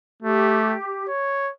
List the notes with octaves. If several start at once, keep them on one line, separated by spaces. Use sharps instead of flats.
A3 G4
C#5